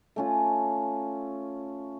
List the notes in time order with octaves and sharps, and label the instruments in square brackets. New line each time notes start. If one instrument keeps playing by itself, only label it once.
[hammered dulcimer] A3 C#4 F4